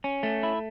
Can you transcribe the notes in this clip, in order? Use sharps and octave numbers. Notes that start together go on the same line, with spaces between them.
C#4
A3
E4